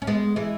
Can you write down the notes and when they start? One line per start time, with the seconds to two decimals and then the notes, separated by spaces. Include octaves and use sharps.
0.02 C#4
0.07 G#3 B3
0.36 E3 G#3